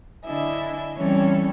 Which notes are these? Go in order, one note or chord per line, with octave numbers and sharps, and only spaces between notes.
D3 D4 E4 D#5 E5 G#5
E3 G3 C4 C#4 A4 C#5